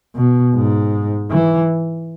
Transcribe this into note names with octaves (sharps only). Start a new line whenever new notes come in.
B2
G#2
E3